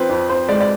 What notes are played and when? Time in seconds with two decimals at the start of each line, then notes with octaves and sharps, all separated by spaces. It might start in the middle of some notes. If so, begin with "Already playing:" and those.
Already playing: F3 C4 B4
0.09 F2
0.29 C4 C5
0.49 G#3 D5
0.60 D5